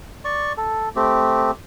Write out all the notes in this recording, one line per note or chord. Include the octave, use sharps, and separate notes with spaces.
D5 C#6
A4
A3 C4 G4